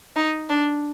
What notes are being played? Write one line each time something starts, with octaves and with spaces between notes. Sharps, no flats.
D#4
D4